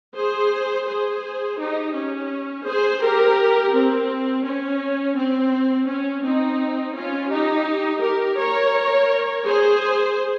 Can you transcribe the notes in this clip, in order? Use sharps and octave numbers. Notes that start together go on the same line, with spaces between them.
G#4 C5
G#4 C5
D#4 G4
C#4
G#4 C5
G4 A#4
C4
C#4
C4
C#4
C4 D#4
C#4 F4
D#4 G4
G4 A#4
A#4 C#5
G#4 C5